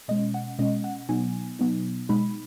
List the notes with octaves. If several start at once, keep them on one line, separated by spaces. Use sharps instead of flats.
B2 G#3 C#4 D#5
F#5
B2 G#3 C#4 D#5
F#5
B2 F#3 B3 D#4 G#5
B2 F#3 B3 D#4
B2 G#3 D#4 B5